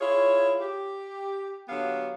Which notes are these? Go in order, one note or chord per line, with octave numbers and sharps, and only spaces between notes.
E4 F4 G#4 C#5
G4
D3 F#3 B3 G4 F5